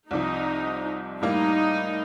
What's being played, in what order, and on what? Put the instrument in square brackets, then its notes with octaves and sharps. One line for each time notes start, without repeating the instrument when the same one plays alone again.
[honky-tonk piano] C2 C3 F3 [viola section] D#4
[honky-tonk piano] A2 G3 A#3 [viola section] D#4